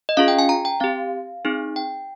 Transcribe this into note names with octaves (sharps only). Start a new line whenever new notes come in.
D#5
C#4 F4 G#4 F5
G5
G#5
A#5
G5
C4 G4 F5
C4 D#4 G#4
G5